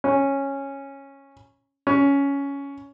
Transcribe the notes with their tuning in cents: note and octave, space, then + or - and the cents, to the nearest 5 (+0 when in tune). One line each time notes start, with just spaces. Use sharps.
C#4 -10
C#4 +10